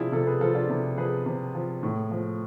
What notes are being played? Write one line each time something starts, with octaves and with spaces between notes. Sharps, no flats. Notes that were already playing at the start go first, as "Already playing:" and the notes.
Already playing: C3 F3 D4 E4 F4 G#4
C3 F4 A4
G#4 B4
F3 F4 A4
D4 F4
C3 E4
F3 G#4 B4
C3
F3
A2
F3